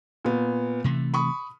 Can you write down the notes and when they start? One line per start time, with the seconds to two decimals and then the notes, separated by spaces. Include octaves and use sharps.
0.25 A#2 B3
0.84 C3 E3 A3
1.14 B5 C#6 D#6